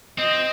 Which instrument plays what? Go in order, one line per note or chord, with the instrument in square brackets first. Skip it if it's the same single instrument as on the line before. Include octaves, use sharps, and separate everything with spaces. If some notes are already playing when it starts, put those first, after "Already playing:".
[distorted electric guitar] C4 [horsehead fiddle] D#5